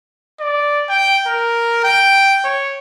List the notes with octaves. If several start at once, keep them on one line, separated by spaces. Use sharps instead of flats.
D5
G5
A#4
G5
C#5